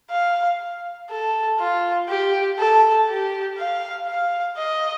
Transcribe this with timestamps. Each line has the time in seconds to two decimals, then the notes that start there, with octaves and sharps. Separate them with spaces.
0.11 F5
1.10 A4
1.59 F4
2.09 G4
2.59 A4
3.08 G4
3.58 F5
4.07 F5
4.57 D#5